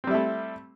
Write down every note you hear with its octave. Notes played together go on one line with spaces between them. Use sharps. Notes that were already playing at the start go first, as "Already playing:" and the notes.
G3 A3 C4 E4